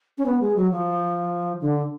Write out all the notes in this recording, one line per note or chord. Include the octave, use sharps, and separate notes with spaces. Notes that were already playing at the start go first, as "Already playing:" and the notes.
C#4
B3
G#3
F#3
F3
D3